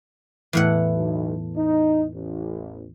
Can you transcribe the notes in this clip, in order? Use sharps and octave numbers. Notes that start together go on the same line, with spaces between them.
E2 A2 F#5
B1
D#4
A1